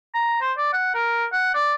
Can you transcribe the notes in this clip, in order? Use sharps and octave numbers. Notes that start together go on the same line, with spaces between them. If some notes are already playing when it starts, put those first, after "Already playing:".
A#5
C5
D5
F#5
A#4
F#5
D5